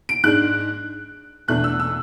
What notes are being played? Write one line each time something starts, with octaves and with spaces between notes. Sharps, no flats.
D7
G#2 G#3 D4 F#6
E2 B2 A3 D4 F#6
E6
E6